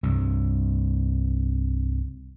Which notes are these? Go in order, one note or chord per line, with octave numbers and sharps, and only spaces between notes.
C2 G2